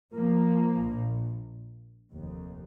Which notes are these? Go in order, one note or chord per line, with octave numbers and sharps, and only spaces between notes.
F3 A#3
A#1 A#2
F1 D#2